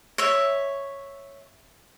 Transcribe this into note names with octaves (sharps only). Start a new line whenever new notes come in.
C#5 E5